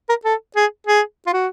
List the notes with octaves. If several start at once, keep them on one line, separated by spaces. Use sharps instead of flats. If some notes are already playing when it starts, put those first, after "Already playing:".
A#4
A4
G#4
G#4
F4
F#4